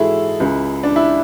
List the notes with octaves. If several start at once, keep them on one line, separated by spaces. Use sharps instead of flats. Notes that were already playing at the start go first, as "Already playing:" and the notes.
Already playing: G#2 E3 G#3 E4 F#4 G#4 A4
C#2 C#3 G#3
D4
E4